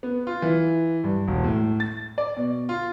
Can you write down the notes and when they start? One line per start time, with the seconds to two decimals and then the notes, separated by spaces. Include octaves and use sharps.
0.03 B3
0.27 F4
0.42 E3
1.04 G2
1.28 E1
1.44 A2
1.80 A6
2.18 D5
2.37 B2
2.69 F4